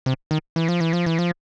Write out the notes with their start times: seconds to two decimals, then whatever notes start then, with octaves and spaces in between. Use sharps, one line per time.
0.06 C3
0.31 D#3
0.56 E3
0.68 F3
0.80 E3
0.93 F3
1.06 E3
1.19 F3